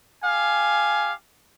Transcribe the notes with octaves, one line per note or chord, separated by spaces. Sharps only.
G4 F5 G#5